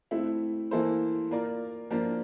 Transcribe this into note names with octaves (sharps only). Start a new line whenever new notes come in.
A3 C4 E4
E3 A#3 E4 A4 C5
A#3 F4 A#4 D5
F3 A#3 D4 F4 A#4